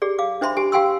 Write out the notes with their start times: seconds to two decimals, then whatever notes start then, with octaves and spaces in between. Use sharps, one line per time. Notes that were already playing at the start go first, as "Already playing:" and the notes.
0.02 G4 G#4 D5
0.19 F5 D6
0.41 D4 C5 E5 B5 C6
0.57 G4 G#5
0.72 G4 F5 G5 G#5 C6 E6